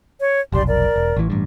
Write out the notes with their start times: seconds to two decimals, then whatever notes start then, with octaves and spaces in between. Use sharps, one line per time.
0.19 C#5
0.52 F1 B1 G4 D5 C6
0.67 A#4 D5
0.96 E1
1.17 A1 E3
1.30 A1 G2